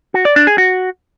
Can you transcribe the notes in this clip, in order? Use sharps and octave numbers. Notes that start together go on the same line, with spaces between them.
F#4
D5
D4
G#4
F#4